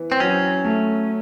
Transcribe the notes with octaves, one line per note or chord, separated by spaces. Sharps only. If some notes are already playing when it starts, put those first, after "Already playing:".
Already playing: E3 B3
C4
F#3 C#4
A3